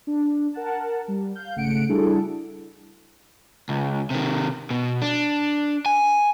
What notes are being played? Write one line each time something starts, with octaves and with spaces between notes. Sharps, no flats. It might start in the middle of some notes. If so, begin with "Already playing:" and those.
D4
A#4 F#5 A5
G3
F5 G6
G#1 C#3 A3 F#5 C#7 D7
G3 D4 E4 F#4 G#4 A4
C#2
C3 D#3
B2
D4
G#5